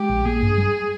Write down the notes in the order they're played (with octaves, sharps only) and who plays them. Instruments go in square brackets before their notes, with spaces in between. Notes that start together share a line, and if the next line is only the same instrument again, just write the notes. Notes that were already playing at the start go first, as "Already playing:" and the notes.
Already playing: [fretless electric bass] G#3 [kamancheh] G4
[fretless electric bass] A#1
[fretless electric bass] A#3 [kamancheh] G#4
[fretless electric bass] G2
G3